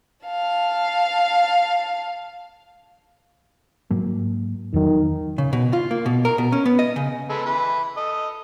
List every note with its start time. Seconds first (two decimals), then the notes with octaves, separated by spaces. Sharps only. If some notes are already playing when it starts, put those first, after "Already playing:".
0.26 F5 A5
3.91 G#2 F#3 A#3
4.74 E2 D#3 F#3
5.38 C#3
5.53 B2
5.73 F4
5.91 A#3
6.06 B2
6.25 A#4
6.38 B2
6.52 C#4
6.66 B3
6.79 D#5
6.96 C#3
7.30 G#3 A4 B4
7.45 E3 B4
7.97 A4 D#5